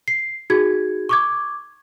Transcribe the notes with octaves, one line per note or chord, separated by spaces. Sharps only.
C7
D#4 F#4 G#4 G#6
C#6 D6 G#6